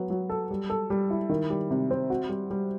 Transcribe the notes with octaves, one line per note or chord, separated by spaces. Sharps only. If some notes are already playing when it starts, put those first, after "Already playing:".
Already playing: F#3 B3
F#3
A4
G3
A4
G3
E4
D#3
G3
C3
C4
F#4
G3
G3